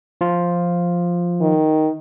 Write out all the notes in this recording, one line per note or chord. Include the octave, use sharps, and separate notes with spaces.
F3 F4
D#3